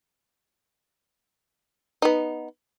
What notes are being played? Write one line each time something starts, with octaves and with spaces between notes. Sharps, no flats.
B3 D#4